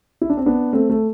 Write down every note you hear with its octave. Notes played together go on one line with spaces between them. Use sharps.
E4
D4
C4
B3 D4
A3 C4
A3